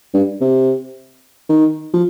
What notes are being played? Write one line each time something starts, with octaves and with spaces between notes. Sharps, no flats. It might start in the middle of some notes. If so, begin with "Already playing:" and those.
G2
C3
D#3
F3